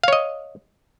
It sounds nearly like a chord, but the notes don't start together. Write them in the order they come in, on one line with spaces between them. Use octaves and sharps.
F5 C#5 D#5